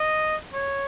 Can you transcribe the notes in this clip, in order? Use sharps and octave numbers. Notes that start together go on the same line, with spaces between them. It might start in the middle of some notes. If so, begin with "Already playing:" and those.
Already playing: D#5
C#5